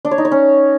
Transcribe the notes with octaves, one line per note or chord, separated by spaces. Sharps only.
D4
C#5
D#4
C#5
C#4